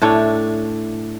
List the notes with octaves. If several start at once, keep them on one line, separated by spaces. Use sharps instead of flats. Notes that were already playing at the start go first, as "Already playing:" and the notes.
A2 A3 D4 C#5